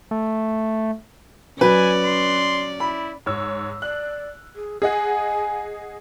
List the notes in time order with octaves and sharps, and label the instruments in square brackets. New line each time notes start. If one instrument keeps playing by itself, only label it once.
[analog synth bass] A3
[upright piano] F#3 [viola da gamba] C#4 D5 [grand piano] B4 [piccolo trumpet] G#5
[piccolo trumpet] C6
[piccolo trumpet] E4 [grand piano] B5
[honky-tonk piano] G#2 C#5 E6
[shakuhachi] D5 [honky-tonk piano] F#6
[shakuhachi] G#4
[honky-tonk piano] G#4 D#5 F#5 [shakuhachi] G#5